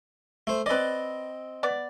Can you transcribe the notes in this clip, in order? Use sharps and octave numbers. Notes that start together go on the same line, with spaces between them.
A3 C5
C4 B4 D5 D#5
B3 D5